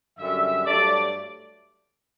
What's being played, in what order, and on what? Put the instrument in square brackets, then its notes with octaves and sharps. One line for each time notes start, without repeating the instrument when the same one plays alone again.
[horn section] F#2 D3 G3 E5
G2 F#3 A3 D5